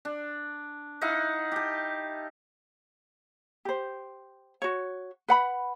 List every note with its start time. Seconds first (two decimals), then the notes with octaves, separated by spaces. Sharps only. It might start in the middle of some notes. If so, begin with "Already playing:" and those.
0.05 D4
1.01 D#4 E4 F5 F#5
1.52 G4 A5
3.65 G4 C5
4.62 F#4 C#5
5.28 B4 F#5 B5